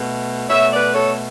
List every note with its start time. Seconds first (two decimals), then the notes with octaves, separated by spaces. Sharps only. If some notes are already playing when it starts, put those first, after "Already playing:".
Already playing: B2 A3
0.49 B2 A3 C#5 E5
0.72 B4 D5
0.94 A4 C#5